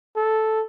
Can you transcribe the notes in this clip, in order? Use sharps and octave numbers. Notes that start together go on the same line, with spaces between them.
A4